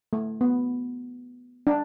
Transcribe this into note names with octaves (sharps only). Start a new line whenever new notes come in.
A3
B3
D4